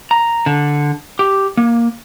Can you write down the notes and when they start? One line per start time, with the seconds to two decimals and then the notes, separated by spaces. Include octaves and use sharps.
0.11 A#5
0.46 D3
1.19 G4
1.57 A#3